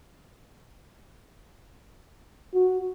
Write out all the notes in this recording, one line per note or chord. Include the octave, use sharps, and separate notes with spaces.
F#4